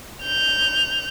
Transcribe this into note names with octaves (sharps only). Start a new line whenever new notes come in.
G6 F7